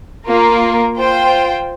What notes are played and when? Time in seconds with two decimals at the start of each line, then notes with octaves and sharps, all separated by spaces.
0.27 A#3 F4 A#4
0.97 F4 C5 G5